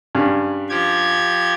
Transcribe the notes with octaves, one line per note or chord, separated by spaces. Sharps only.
G2 C#3
F3 G4 G#6